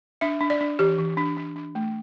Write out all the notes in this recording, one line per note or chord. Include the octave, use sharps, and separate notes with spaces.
D4 E5
D4
D5
D4
E3 G4
E3
D4
D4
D4
A3